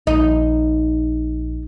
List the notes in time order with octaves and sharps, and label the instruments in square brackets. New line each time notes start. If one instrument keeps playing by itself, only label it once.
[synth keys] A#1 [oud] D#4